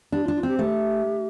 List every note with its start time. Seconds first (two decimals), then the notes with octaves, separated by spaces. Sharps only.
0.12 D4 G4
0.24 F4
0.28 D4
0.35 F4
0.43 C4 G4
0.59 A3 G4